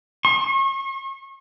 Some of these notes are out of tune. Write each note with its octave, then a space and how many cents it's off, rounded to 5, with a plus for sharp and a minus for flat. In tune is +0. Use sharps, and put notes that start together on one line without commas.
C#6 -40